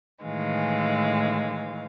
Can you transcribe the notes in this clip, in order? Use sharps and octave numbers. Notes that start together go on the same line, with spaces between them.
A2 D#3 E3 G#3 F5